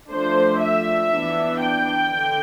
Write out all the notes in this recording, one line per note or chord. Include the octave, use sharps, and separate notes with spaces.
F3 A3 D4 C5
E5
E3 B3 D4
G5
D3